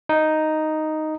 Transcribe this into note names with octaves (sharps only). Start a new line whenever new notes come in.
D#4